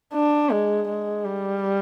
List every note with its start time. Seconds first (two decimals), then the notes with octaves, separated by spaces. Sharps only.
0.14 D4
0.51 G#3
0.88 G#3
1.25 G3